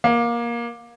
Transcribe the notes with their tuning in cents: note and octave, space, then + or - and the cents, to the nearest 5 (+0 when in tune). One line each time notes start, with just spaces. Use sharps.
A#3 +20